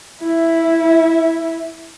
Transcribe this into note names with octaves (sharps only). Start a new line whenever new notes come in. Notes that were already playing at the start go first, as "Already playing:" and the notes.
E4 E5